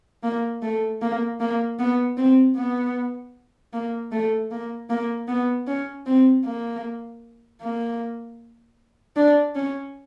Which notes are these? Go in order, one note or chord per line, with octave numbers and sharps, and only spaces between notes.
A#3
A3
A#3
A#3
B3
C4
B3
A#3
A3
A#3
A#3
B3
C#4
C4
A#3
A#3
D4
C#4